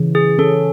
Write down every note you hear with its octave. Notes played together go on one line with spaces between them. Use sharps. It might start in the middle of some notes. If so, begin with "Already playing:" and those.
Already playing: C#3 E3
G#4
C#4 A4